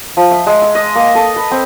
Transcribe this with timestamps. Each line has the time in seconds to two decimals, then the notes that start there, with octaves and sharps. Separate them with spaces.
0.17 F3
0.31 E5
0.46 G#3
0.62 E6
0.75 D#5
0.95 A#3
1.15 A4
1.36 B4
1.51 C4